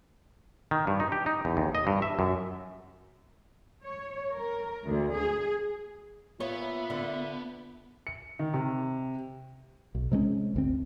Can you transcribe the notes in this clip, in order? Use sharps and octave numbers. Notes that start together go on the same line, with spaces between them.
D#3
G2
D#4
G4
D#4
E2
D#2
D#5
G2
E5
F#2
C#5
A#4
D2
G#4
A#2 B3 F4 C#5 E5
D3
C#7
D#3
C3
B1
C3 G#3 A#3 C#4
G1 D2 C4